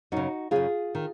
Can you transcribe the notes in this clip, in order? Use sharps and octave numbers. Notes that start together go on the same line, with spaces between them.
F#2 C#3 D#4 F#4
F#2 C#3 F4 G#4
D#3